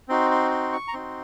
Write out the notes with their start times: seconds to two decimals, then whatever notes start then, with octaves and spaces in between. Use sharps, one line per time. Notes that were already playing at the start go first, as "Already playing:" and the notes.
0.09 C4 D#4 F#4 C6
0.31 C6
0.51 C6
0.73 C#6
0.88 A#5
0.93 C4 D#4 F#4 C6